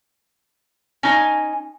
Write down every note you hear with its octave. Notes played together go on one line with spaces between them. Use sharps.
C#4 D#4 G#5